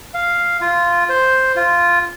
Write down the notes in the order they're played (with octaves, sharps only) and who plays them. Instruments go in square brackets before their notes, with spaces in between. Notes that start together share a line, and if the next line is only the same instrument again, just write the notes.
[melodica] F5
F4
C5
F4